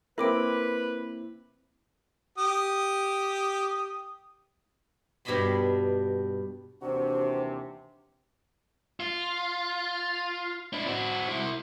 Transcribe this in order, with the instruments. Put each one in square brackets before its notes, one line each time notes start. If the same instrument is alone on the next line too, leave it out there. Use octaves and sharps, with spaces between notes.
[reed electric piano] A#3 C4 E4 [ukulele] A#4 [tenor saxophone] B4 [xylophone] B5 D6 D7
[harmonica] G4 D#6
[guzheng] G2 B2 D4 D#5 B5 C6
[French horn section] D#2 E3 D4 [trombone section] C3 [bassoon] F#4 [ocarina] C5
[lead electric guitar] F4
D4 E4
C4 F#4
C3 E4